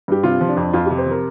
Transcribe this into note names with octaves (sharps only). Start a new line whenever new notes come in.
G2 G4
C3 F4
F3
D4
F2
F2 F4
C3 G4
C5
F3 A#4